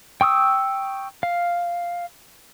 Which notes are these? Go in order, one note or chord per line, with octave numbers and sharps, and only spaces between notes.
G5 C#6 D#6 E6
F5